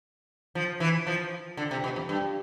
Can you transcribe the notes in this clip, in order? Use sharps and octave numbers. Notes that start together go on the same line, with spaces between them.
F3
E3
F3
D3
C3
B2
F2
G2